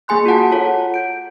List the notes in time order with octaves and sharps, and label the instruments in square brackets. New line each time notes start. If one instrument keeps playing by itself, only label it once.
[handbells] A#3 G#4 G#5 C6 F#6
F4 F#4 F#5 A5
F4 A4 C#5 F#5
G6 D7